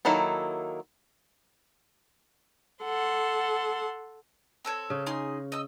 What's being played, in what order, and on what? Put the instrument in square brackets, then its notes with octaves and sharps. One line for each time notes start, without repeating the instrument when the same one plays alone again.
[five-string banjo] D#3 F#3 A#3 E4 A4
[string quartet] A4 F#5 C6
[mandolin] C4 A4 C#5
[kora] C#3
[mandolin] D#4 G#4 C6
D#5 E6